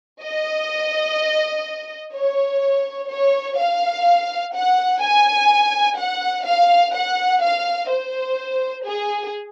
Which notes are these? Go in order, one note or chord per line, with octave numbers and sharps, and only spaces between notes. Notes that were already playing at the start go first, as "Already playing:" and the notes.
D#5
C#5
C#5
F5
F#5
G#5
F#5
F5
F#5
F5
C5
G#4